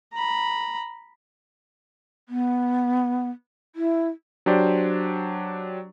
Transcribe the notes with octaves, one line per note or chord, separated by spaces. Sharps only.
A#5 B5
B3
E4
F#3 D4 G4 C5 D5